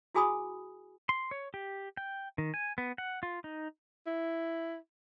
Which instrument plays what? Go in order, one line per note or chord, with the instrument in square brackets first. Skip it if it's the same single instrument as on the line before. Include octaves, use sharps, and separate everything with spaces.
[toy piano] E4 F#4 G#4 G#5 B5 D#6
[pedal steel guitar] C6
C#5
G4
G5
D#3
G#5
B3
F#5
F4
D#4
[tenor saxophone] E4